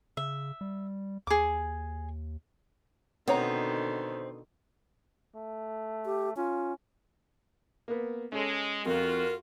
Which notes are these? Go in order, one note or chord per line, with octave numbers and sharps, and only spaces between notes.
C#3 E5
G3
D#2 G#4 D6
B2 D3 D#3 B3 C4 C#5 A#5
A3
G4
C#4 F4
A#3 B3
G#3 C#4 A4
F2 F4 F#4 A#4